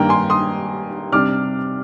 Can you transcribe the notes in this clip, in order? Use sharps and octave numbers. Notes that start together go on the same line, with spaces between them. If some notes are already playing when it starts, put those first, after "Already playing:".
Already playing: G2 D#3 A#3 D4 G5 A#5
G#5 C6
C6 D#6
C3 G3 D4 D6 F6